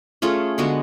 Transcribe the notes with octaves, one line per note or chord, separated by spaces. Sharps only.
A3 C#4 F4 G#4
D3 G#3 B3 F#4